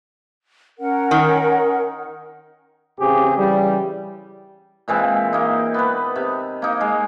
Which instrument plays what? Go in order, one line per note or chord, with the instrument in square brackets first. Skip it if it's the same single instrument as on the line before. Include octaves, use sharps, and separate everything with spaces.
[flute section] C#4 A#4 F#5
[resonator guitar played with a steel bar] D#3
[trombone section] A1 C#3 C4 G4 G#4
C#3 E3 G3
[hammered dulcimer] A#2 E3 G#3 C4
A#3 D#4
B3 B4
C3
A#3 D#4
G#3